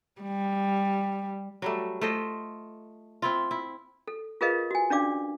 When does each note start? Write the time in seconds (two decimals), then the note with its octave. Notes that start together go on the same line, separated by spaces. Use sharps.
0.22 G3
1.62 F#3 G3 A3
2.01 A3 F4 C5 D#5
3.22 C4 E4 F4
3.51 E4
4.08 A4
4.41 F4 G#4 A#4 B4 D#5 F5
4.71 F#4 G#5
4.90 C#4 D4 D5 F5 D6